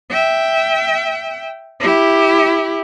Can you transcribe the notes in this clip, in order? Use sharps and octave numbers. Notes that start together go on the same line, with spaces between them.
E5 G5
E4 G4